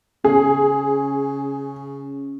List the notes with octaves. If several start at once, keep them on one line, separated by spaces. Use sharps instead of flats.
C#3 G#4